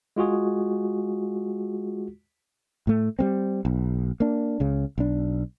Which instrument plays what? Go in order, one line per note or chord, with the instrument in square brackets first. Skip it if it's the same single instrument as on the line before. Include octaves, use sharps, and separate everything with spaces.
[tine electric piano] G#3 F4 F#4 G#4
[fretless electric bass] A2 A3
G3 A#3 C4
B1
A#3 D4
C#2 C#3
B1 D4